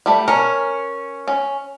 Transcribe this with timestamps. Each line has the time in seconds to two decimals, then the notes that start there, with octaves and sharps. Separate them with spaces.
0.06 G3 A3
0.28 C#4 A#4
1.28 C#4